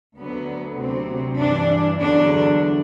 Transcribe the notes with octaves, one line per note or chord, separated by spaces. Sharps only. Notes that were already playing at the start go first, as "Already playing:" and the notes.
D2 D3 F#3 B3
D2 C3 F#3 C4
G2 E3 D4
E2 D3 F#3 D4